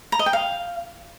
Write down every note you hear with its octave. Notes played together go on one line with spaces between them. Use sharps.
A#5
D#5
G5
F5